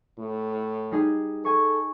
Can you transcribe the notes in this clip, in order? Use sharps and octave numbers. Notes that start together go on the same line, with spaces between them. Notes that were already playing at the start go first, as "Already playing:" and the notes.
A2
G3 D#4 G#4
A4 G#5 C#6